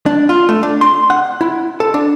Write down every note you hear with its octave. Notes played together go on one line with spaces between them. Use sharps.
D4
F4
A3
D4
C6
F#5
E4
A4
D4